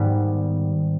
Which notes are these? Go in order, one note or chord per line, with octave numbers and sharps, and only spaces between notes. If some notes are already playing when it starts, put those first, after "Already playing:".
Already playing: G#2 D#3 G3 B3